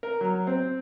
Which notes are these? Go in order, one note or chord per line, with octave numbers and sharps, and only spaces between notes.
A#4
F#3
C4